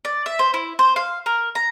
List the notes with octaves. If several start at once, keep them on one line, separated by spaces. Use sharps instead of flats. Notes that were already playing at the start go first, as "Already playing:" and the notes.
D5
E5
C5
E4
C5
F5
A#4
A#5